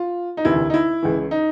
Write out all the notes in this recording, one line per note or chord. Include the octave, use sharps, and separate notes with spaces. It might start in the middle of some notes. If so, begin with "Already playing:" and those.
Already playing: F4
D#4
E1 D2 C3 E3 E4
D#4
E4
C#2 C#3 E3
D#4